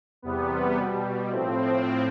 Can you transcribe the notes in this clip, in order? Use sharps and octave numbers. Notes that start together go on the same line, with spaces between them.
E2 C3 G3 B3
B2 G3
A2 F3 C4